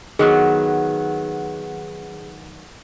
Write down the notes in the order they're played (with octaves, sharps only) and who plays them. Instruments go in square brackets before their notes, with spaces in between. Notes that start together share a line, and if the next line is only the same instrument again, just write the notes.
[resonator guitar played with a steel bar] D#3 F#3 B3 [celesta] G#4